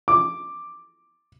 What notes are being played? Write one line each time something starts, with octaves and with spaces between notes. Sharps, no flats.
D6